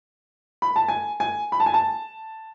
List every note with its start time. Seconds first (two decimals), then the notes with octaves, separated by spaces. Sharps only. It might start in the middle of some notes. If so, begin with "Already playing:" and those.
0.62 B5
0.76 A5
0.88 G#5
1.20 G#5
1.52 B5
1.60 A5
1.66 G#5
1.74 A5